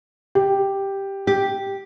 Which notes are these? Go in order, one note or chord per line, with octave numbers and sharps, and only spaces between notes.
G4
G4